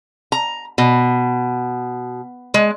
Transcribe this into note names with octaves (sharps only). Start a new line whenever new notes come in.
A#5
B2
G#3